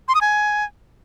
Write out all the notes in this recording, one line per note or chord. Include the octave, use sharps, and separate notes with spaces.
C6
D#6
G#5